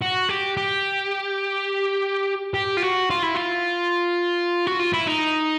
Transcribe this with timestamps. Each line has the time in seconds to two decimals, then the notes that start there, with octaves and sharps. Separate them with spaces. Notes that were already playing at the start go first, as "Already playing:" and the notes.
0.02 F#4
0.29 G4
0.57 G4
2.54 G4
2.77 F4
2.82 F#4
3.10 F4
3.23 E4
3.36 F4
4.67 F#4
4.80 F4
4.93 E4
5.07 D#4